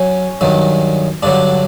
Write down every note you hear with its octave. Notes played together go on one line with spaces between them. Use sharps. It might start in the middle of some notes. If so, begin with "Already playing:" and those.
Already playing: F#3 C#4
G2 D#3 F#3
G2 D3 F#3 D4